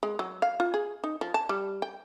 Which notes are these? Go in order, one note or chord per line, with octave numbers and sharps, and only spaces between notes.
G#3
F#3
F5
F4
G#4
D#4
F3
A5
G3
G5